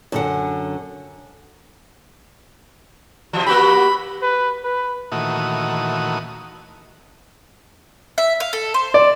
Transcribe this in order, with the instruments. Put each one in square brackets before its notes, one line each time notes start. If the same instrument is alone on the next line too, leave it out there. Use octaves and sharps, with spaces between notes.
[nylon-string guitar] F#2 D3 F#5
[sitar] C3 E3
[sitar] A#3 F#4 G4 [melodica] B5
[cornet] B4
B4
[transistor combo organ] A#2 D#3 E3 A3 F#4 D#6
[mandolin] E5
F5
A4
C5
[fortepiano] D5